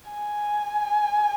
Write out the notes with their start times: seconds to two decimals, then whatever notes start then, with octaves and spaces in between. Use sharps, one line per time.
0.10 G#5